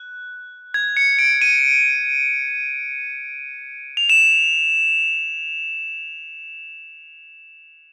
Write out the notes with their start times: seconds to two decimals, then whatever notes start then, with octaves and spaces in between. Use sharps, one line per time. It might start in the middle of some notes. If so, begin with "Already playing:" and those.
Already playing: F#6
0.74 G#6
0.97 C#7
1.19 D7
1.41 D#7
3.97 F7
4.09 E7